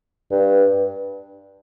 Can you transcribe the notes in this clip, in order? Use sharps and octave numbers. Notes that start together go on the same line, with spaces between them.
G2